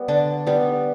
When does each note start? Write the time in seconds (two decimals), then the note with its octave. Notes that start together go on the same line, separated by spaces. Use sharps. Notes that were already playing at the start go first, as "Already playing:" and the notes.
Already playing: G3 B3
0.08 D3 D4
0.47 G3 B3